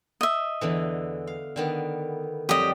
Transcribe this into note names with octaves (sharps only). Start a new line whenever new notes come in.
D#5 E5
E2 D3 E3
F5
D3 D#3 B3
F2 F#3 G3 G4 D#5